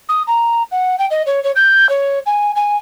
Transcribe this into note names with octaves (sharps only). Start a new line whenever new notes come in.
D#6
A#5
F#5
G5
D#5
C#5
C#5
G6
C#5
G#5
G#5